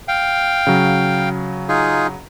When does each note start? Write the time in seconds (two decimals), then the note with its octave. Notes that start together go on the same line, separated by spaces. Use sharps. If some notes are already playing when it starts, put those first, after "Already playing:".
0.08 F5 G5
0.67 C#3 F#3
1.69 D#4 F4 G#4